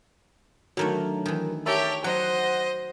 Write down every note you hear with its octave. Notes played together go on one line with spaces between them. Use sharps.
D3 D#3 F#3 A3 A#4
D#3 E3
G4 A#4 C#5 E5 A5
F#3 C5 D#5 F#5